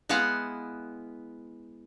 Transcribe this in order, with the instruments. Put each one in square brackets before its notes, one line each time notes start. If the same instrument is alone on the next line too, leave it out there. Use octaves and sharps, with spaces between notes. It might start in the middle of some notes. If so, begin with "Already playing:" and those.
[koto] G#3 B3 E4 F5 F#5